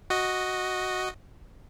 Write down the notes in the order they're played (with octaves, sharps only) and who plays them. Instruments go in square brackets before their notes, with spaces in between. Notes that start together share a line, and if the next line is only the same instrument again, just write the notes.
[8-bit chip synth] F#4 D#5